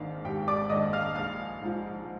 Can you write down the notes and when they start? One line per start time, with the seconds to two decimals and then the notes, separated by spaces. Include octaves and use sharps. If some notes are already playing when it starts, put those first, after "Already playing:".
Already playing: G#1 G#2 D#3 A#3 D4 F5
0.25 G#1 G4 G5
0.48 D5 D6
0.70 G#2 D#3 A#3 D4 D#5 D#6
0.93 F5 F6
1.15 A#1 F5 F6
1.61 G#2 F3